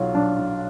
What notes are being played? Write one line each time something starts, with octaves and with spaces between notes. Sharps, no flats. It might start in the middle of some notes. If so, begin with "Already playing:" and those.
Already playing: B1 F#3 F4
F#3 D4
F#3